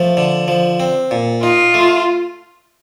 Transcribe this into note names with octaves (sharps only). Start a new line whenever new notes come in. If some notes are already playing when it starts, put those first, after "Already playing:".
Already playing: F3 A3
D3
F3
C4
A#2
D#4 F4
A3